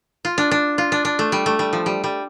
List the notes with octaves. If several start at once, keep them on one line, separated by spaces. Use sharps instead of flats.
F4
D4
D4
F4
D4
D4
A3
G3
A3
G3
F3
G3
G3